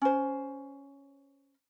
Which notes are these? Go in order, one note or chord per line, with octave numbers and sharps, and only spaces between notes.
C#4 C5